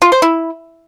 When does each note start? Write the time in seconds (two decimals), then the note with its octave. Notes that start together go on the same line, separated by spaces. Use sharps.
0.02 F4
0.12 C5
0.22 E4